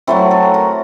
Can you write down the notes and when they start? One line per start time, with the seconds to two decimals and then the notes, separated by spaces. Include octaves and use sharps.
0.07 F#3 A3 C4 E4 A4
0.31 A4
0.54 A#4